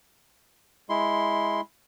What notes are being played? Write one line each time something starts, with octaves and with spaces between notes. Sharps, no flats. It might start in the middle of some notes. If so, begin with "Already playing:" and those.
G#3 E4 C6